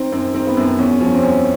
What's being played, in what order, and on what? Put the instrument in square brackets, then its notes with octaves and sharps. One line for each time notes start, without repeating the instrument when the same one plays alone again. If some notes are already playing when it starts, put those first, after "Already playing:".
Already playing: [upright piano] D#3 C4
F#2 C4
D#3 C4
B3
F#2 C4
E2 C#4
F3 C#4
C4
E2 C#4